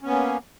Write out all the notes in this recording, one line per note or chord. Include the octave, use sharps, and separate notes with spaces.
A#3 B3 C#4